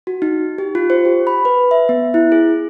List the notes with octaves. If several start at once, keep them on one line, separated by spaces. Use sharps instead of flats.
F#4
D#4
G4
F4
C5
G4
B5
B4
E5
B3
E4
G#4